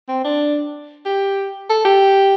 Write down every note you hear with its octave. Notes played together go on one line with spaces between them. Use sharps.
C4
D4
G4
A4
G4